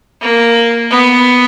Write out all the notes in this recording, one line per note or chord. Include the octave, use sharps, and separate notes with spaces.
A#3
B3